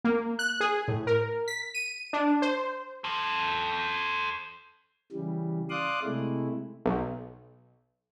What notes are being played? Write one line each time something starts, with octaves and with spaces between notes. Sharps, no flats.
A#3
F#6
G#4
A2
A#4
B6
D#7
D4
C5
A4 C5
C#3 E3 G3
D5 F5 C6 D6 D#6 F#6
C3 G#3 A3 E4
B1